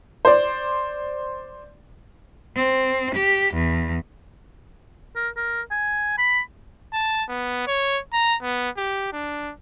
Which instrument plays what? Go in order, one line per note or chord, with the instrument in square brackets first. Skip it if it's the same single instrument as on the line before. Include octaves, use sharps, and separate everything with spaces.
[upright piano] C5 D5
[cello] C4
G4
E2
[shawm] A#4
A#4
G#5
B5
[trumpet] A5
B3
C#5
A#5
B3
G4
D4